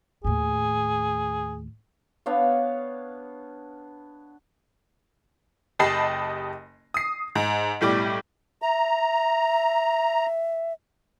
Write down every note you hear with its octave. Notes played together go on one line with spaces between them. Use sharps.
D#2 A2 G#4
B3 D4 C#5 F5
F#1 G4 D#5 A5 B5 C7
D#6 C7
G#2
B1 A2 G3 D6
E5 A#5